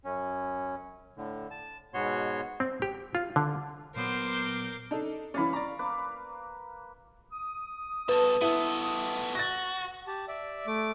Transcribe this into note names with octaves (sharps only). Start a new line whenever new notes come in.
F#2 C#4
A2 D3
A5
G#2 B2 B3 F#4 C#5 C6
C4
G4
F4
D3
A#2 F#3 B3 A#4 C5 D6 G6 C7
D4 D#4 A4
E3 C#4 D5 F5 B5
D5 A#5 C#6
A#3 B4 D6
D#6
B2 A4 B4 A5
B3 E4 A4 D#7
F#4 A6 A#6
G4 A5
D5 E5
A3 D6